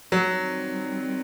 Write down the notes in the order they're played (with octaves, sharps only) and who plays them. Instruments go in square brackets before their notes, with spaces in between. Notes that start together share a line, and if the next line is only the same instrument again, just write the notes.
[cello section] D#3 G3 C4 [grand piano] F#3